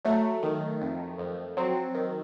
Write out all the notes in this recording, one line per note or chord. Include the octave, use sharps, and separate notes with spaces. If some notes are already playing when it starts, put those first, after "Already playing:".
F#3 A3
D#3
F2
F2
F#3 C4
D#3